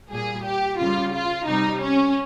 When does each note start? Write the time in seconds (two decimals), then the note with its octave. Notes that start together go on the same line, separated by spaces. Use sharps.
0.11 A#2 G3 G#4
0.46 G4
0.79 C#3 G3 F4
1.14 F4
1.48 C3 G3 D#4
1.82 C#4